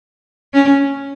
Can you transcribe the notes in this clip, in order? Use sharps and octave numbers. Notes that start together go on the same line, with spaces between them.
C#4